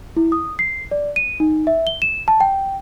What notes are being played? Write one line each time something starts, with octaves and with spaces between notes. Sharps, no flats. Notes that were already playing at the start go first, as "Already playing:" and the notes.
E4
D#6
C7
D5
D#7
D#4
E5
G7
E7
A5
G5